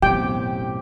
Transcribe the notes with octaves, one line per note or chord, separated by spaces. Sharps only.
A1 F#2 B2 C4 G4 G5 D6